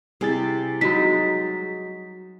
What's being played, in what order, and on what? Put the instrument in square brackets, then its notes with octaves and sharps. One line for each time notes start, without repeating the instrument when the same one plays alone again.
[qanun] C3 E4 [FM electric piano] G3 G#4 A6
[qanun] F#3 G#3 D#4 [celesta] F#4 B6